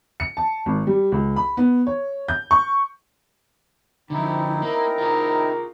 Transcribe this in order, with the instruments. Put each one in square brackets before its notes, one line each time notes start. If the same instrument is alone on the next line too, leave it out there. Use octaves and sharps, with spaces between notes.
[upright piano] C#7
A5
G#1
G3
C#2
B5
B3
C#5
G6
C#6
[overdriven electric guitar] D3 F3 [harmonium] C4 D#4 E4
[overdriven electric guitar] A#3 [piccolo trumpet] A#4
[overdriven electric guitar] F4 G#4